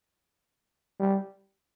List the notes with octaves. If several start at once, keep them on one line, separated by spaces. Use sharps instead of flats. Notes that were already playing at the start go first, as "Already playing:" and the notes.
G3